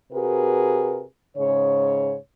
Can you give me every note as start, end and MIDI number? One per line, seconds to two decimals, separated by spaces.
0.12 1.03 48
0.12 1.03 66
0.12 1.03 68
0.12 1.03 70
0.12 1.03 71
1.37 2.16 44
1.37 2.16 49
1.37 2.16 73